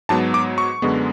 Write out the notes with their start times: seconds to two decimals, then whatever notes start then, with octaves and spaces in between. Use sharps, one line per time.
0.09 G#2 F#3 B3 A5
0.34 D6
0.58 C#6
0.82 F#2 D3 G#3 B3